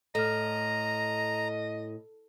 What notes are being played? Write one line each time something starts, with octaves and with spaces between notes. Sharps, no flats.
A2 A4 D#5 A#5 F6